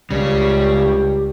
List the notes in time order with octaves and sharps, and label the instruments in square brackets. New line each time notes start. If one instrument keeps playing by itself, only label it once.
[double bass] C#2 [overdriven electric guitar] C#3 [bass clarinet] G3 [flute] G4